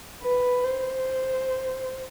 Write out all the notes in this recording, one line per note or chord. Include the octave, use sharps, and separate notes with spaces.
B4
C5